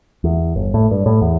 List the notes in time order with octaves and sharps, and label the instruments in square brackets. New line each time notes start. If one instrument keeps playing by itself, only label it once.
[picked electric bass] E2
G1
A2
G2
A2
E2